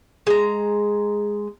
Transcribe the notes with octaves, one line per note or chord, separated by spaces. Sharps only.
G#3 A#5